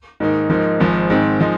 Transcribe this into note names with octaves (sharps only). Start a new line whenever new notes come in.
G#2 D#3 A#3 D#4
G#2 F3 A#3 D#4
G#1 G#2 F3
G#2 D#3 C4
F3 G#3 D#4